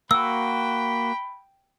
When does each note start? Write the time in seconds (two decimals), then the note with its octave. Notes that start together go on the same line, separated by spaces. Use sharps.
0.11 A#3 F#4 G5 B5 E6